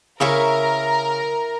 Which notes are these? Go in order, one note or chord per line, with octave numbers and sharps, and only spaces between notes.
C#3 E4 A#4 E5 C#6